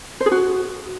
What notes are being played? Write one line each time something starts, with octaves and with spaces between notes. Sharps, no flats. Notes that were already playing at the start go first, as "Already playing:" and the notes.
C5
G#4
F#4